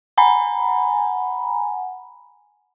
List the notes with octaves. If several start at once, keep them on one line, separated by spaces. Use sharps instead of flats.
F#5 G#5 A#5 B5